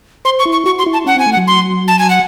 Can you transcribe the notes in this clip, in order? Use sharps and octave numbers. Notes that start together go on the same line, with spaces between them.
C5 C6
C#6
E4
C#6
F#4 C#6
C6
E4
A5
C#4 F#5
C4 G#5
A3
F#5
F#3
C6
A5
G#5
F#5